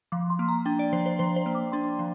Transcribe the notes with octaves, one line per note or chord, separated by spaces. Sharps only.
F3 D6
C6
A#3
A#5
D4 G5
D5
F3 C5
C5
F3 C5
C5
A#3
D6
D4 C6
F3